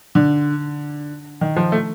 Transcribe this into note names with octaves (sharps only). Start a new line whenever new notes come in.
D3
D#3
F3
A3